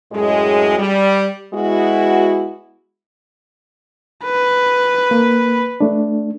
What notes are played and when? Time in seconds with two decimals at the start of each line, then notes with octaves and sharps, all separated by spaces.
0.12 F#2 A2 G#3
0.78 G3
1.53 G#3 B3 E4 F#4
4.25 B4
5.11 A#3
5.81 A3 D4